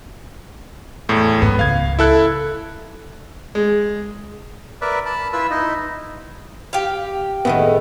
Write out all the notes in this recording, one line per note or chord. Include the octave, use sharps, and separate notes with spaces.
E2 A2
G#2 B3
C#2 F5 G#6
E4 A4 F#6
G#3
A#4 B4 D5 E5
A5 B5
E4 F4 B4 E5 E6
D#4 E4 D#5
G4 F5
A2 D#3 G#3 B3 E5